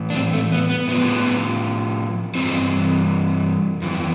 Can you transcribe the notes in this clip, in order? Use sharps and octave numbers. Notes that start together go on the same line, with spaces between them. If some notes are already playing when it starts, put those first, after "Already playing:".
Already playing: A2 E3
D4
C4
A3
B3
B3
A2 F3 B3
G2 E3 C4
F2 E3